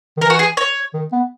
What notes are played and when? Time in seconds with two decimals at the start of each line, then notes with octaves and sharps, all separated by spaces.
0.17 D#3
0.21 E3 A#4
0.30 F#4
0.39 G#4
0.57 C#5
0.94 D#3
1.12 B3